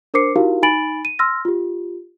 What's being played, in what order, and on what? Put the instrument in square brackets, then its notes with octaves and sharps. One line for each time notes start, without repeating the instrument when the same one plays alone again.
[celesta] D4 A#4 C5 D6 C7 C#7
D#4 E4 F#4 G4 A#4 F5
D#4 G#5 B5 A6 D7 F#7
D#7
C6 E6 F6 A#6
F4 G4